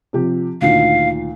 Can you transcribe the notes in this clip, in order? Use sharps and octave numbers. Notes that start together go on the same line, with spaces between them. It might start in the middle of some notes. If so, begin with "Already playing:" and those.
C3 F3 G4
D2 A#2 D#3 F5